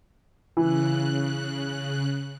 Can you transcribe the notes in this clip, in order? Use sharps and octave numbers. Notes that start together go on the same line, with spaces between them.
C#3 E3 F#6